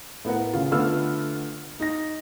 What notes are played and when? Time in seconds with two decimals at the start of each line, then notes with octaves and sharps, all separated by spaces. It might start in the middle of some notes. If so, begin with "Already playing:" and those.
0.25 A2 B3 A#4 F#5
0.53 C#3 F4
0.71 D3 A3 B3 F4 E6 F6
1.80 D#4 A#6